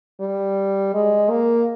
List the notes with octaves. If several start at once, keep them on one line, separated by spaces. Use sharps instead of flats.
G3
G#3
A#3